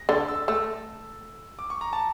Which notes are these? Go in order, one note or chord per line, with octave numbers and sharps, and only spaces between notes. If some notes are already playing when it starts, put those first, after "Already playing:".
Already playing: A#6
D3 A6
E6
A3 E6
D6
C#6
A#5
A5